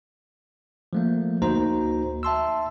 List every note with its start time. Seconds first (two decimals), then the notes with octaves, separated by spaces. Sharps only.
0.93 F3 A3 A#3
1.42 D2 A#3 D#4 F#4 C5 A#5
2.23 E5 A5 C6 E6